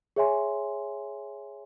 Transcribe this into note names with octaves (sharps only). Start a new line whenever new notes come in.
G#4 C#5 E5 G#5 C6